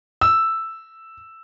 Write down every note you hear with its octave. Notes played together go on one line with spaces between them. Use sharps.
E6